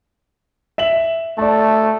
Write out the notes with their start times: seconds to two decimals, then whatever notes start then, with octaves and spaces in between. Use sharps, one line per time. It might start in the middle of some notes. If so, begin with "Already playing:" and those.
0.78 E5 E7 F#7
1.38 A3 D5 A5